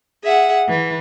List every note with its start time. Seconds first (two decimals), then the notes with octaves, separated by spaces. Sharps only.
0.23 G#4 E5 F#5
0.69 E3